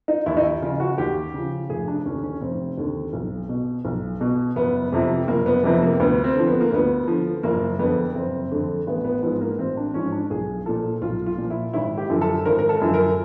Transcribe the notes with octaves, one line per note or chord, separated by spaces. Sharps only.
D#4
D#2 E4
D#4
E4
C#3 F3 F4
F#4
D#2 G4
C#3 F3
F1 G#4
D4
D#2 D3 C#4
C#4
F1 C4
D#2 D3
B1
B2
B1
B2
F#1 B3
F2 C3 F3
F#1 A#3
B3
F2 C3 F3 B3
A#3
D2 B3
C4
D3 F3
B3
A#3
D2 B3
D3 F3
F#1 A#3
F2 D3 B3
F#1 C4
F2 D3
A1 B3
B3
G#2 F3 B3
A#3
A1 C4
D4
G#2 F3 C#4
D4
B1 G#4
A#2 F3 A4
B1 F4
F4
A#2 F3
E4
G#1 E4
G4
F#2 D3 F3
A4
G#1 A#4
A#4
A4
F#2 D3 F3
A#4